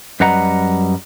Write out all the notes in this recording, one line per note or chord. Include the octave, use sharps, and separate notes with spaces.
F#2 G3 B4 D#5 F#5 A#5